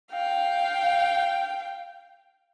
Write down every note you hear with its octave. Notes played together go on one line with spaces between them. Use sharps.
F5 G5